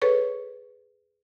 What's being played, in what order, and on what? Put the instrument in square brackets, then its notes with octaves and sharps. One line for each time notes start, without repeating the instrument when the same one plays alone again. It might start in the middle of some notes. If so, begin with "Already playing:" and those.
[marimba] G#4 A4 B4 C#5 C#6